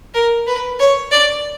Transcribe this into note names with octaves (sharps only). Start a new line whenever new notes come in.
A#4
B4
C#5
D5